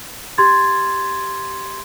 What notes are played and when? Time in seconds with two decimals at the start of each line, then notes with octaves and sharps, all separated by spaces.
0.38 G4 C6 G#6 A6